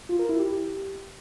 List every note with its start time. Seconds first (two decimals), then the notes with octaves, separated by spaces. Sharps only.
0.09 F4
0.19 A#4
0.29 E4
0.39 G4